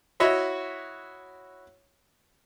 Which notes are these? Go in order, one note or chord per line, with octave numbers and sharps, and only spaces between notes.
E4 F#4 C#5 D#5 E5